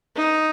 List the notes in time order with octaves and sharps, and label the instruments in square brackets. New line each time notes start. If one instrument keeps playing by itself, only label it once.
[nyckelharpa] D#4